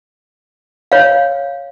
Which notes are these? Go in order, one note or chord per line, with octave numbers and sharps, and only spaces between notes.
C#5 F5